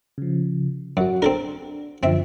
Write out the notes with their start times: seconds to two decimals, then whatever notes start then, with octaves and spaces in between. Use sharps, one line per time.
0.18 C#3 F3
0.97 F#2 F#4 F#5
1.22 C4 D4 A4 A#4
2.03 F#2 D3 F3 C4 E5